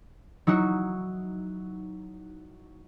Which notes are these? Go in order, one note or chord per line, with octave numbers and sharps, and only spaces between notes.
F#3 D#4 E4 F#4